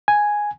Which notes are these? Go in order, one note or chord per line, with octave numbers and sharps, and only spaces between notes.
G#5